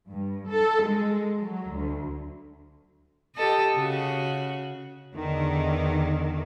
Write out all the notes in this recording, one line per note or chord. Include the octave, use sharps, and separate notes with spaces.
G2
A4
G#3
F#3
D2
G4 A4 D#5
C#3 F#4
E2 D3 D#3